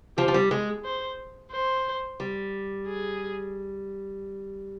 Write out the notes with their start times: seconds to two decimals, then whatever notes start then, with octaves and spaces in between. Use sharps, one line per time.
0.17 F3 G4
0.28 F3
0.34 G3
0.51 G#3 G#4
0.84 C5
1.52 C5
2.20 G3
2.87 G#4